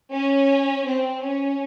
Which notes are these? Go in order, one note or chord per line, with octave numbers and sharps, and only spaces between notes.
C#4
C4
C#4